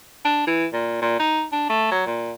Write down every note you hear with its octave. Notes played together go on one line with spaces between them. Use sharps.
D4
E3
A#2
A#2
D#4
D4
A3
F#3
A#2